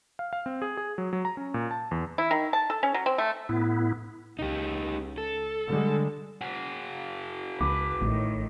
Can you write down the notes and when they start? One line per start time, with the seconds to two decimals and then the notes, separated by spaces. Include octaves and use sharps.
0.19 F5
0.33 F5
0.46 C4
0.62 G#4
0.77 G#4
0.98 F#3
1.13 F#3
1.25 A#5
1.37 C#4
1.54 A#2
1.71 A5
1.91 E2
2.18 E4
2.31 D#3
2.53 A5
2.70 A4
2.83 C#4
2.94 F#3
3.06 C4
3.18 A3
3.49 A2 B3 E4
4.39 C#2 D#4 G4
5.18 A4
5.67 D3 G3 G#3
6.41 F#4 G#4
7.61 C#2 B4 D6
8.02 A1 A2 D#3